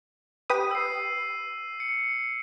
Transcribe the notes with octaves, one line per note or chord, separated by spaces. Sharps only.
G4 B4 D#6 D#7
E6 C7
C#7